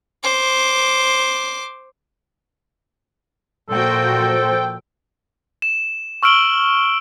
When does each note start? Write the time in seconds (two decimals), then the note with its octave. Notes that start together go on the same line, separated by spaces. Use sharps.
0.23 C5 D6
3.69 A#2 F3 F#4 A4 C5 G5
5.62 E7
6.23 C#6 E6 F6 D7 F#7 G7